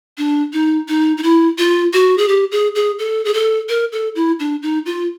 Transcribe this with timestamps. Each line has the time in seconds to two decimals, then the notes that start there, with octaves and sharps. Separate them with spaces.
0.18 D4
0.53 D#4
0.88 D#4
1.17 D#4
1.23 E4
1.58 F4
1.93 F#4
2.18 G#4
2.28 G4
2.52 G#4
2.75 G#4
2.99 A4
3.25 G#4
3.34 A4
3.69 A#4
3.92 A4
4.16 E4
4.40 D4
4.63 D#4
4.86 F4